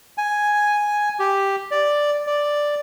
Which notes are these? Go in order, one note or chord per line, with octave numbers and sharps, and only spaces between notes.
G#5
G4
D5
D5